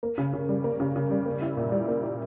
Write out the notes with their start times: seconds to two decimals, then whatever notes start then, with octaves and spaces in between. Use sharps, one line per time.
0.03 A#3
0.18 C#3
0.33 C#3
0.49 G3
0.64 A#3
0.80 C#3
0.96 C#3
1.11 G3
1.26 A#3
1.42 E4
1.57 A#2
1.72 G3
1.88 A#3
2.03 E4